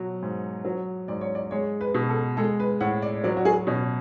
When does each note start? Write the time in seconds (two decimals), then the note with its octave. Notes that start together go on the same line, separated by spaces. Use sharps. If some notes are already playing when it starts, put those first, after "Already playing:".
Already playing: B2 F#3
0.22 G#2
0.65 F#3
1.08 G#2 D5
1.21 C#5
1.35 D5
1.51 G#3 C#5
1.81 B4
1.94 B2
2.09 A4
2.37 G#3 A4
2.60 B4
2.81 A2 F#5
3.02 D5
3.24 F#3 D5
3.37 F#4
3.45 G#4
3.67 B2 C#4